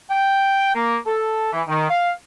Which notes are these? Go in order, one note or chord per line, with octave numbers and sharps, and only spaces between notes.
G5
A#3
A4
E3
D#3
F5